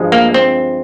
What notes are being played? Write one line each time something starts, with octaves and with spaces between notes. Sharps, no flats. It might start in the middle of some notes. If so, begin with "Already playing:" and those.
Already playing: G2 F3 G#3
A#3
C4